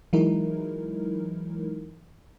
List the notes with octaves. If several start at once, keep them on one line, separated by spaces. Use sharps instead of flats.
E3 F#3 G#3 D#4 E4 A#4